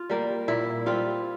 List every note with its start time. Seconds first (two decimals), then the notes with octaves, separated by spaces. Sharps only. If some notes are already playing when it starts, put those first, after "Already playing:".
Already playing: F4
0.10 G3 A#3
0.48 A#2 E4
0.86 G3 C4 F4